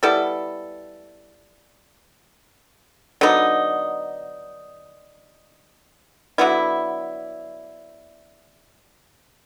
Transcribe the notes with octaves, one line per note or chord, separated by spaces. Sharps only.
G3 B3 E4 A4
D3 F#3 B3 D#4
D3 F#3 B3 E4